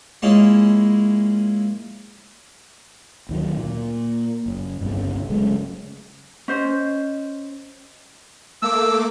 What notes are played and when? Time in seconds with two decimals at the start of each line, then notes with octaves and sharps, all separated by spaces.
0.22 G#3 A#3 C#4 E4 F4 G#4
3.29 D2 D#3 F#3
3.57 A#2
4.46 F#1
4.81 G1 C2 G2 C#3
5.29 C#3 F#3 G#3 A3
6.48 C#4 C5 D#5
8.62 A3 A#3 D6 E6